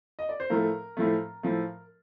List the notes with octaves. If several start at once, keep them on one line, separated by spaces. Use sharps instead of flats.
D#5
D5
C5
A2 F3 A3 A#4
A2 F3 A3
A2 F3 A3